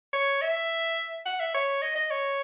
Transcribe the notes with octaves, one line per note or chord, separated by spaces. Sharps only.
C#5
E5
F#5
E5
C#5
D#5
D#5
C#5